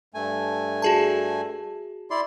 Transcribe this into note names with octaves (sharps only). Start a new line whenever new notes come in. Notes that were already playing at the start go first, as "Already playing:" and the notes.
G2 A3 G#5
F#4 G#4 A5
E4 D5 C6